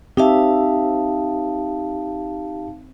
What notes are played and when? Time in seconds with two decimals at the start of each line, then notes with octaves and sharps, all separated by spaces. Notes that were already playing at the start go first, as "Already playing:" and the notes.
0.17 C4 D#4 G4 E5 F5 A5